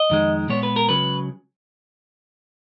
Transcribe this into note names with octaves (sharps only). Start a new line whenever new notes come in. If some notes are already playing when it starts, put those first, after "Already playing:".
Already playing: D#5
F2 D#3 G#3
A#2 G#3 B3 C#5
B4
A#4
C#2 C#3 F#3 B4